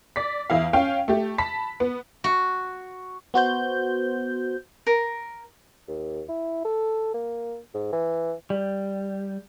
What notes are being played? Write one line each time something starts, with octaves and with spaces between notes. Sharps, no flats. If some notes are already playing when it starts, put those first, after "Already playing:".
D5 B6
E2 E4 F5
C#4 F5 G5
A3 G4
A5 B5 B6
B3
F#4
B3 F#4 C5 G6
A#4
D#2
E4
A4
A#3
G#2
E3
G3 D5